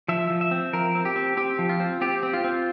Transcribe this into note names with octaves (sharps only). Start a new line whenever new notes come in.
F3 E5
F3
E5
C4
F3 A#4
C4
G4
C4
C4 G4
F3
F4
C4
C4 G4
C4
F4
C4